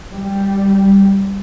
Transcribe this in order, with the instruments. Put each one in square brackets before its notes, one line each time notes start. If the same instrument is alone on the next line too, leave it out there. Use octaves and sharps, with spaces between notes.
[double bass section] G3